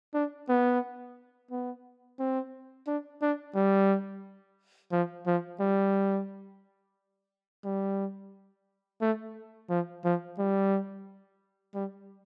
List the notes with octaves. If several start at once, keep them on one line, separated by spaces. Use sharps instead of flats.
D4
B3
B3
C4
D4
D4
G3
F3
F3
G3
G3
A3
F3
F3
G3
G3